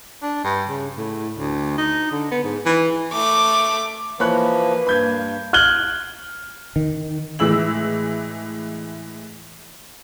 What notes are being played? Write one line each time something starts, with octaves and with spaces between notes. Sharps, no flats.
D4
G2
C#3
A2
D2
D#4
D3
B3
G#2
E3
A3 D6
E3 F3 A#3 B4 C#5 B5 F#6
G2 B5 G6 G#6
F6 F#6 G#6 F#7 G7
D#3
A2 E3 G#3 E6 F#7